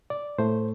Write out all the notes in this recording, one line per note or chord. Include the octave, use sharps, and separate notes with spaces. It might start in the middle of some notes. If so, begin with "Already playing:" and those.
D5
A2 A3 C5